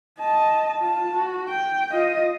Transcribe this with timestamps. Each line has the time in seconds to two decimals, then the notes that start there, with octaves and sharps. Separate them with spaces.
0.19 D#5 A5
0.81 F4 A5
1.14 F#4
1.50 G5
1.91 F4 D#5